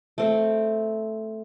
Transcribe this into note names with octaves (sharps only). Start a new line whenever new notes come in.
A3 C4